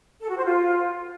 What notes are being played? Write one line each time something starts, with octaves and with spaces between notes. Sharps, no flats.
A4
F#4
C5
F4